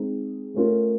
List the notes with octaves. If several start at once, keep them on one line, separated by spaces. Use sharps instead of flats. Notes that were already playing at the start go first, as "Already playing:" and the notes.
Already playing: G#3 C4 D#4 G#4
A3 C#4 F4 A#4